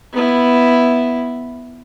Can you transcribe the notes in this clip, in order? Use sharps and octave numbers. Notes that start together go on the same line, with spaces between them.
B3 E4